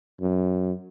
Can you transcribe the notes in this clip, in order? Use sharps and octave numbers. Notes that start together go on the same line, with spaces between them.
F#2